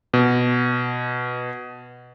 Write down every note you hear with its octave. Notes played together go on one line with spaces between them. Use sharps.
B2